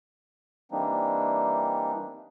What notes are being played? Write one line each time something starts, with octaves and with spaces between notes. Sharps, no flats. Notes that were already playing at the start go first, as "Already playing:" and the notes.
E3 G3 A#3 C4 D4 D#4